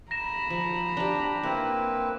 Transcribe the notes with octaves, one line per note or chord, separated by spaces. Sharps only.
A#5 B5 A#6 E7
F3
D4 G4
A#3 C4 E4 B4